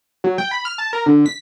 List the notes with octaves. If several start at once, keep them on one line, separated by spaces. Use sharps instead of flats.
F#3
G5
B5
F6
A5
A#4
D3
B6